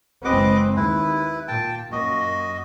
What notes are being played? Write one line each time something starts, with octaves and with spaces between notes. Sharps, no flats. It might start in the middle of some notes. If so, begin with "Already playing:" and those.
F#1 G#3 C4 B4 D#5 D6
D#2 E4 B4
A#2 G5 A5
F#2 A#3 F#4 D#5